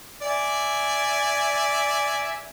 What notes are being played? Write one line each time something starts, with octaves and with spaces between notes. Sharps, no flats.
D5 E5 G#5